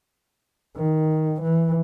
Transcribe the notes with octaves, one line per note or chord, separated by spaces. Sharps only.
D#3
E3